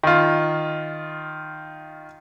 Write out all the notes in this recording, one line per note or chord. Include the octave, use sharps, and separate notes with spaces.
D#3 F4